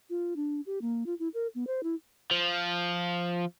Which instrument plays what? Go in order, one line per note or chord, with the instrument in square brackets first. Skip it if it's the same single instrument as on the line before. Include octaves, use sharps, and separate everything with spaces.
[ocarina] F4
D4
G4
A#3
F4
E4
A#4
B3
C5
E4
[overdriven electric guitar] F3